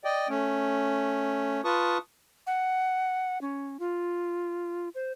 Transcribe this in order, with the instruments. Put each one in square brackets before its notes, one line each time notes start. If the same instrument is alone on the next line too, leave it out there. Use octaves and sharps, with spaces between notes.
[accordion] D5 D#5 G5
A3 C#4
F4 B4 A5 C#6 D#6
[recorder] F#5
C#4
F4
C5